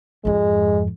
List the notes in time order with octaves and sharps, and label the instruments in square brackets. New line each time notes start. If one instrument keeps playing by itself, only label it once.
[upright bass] F2 G#2 [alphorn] G#3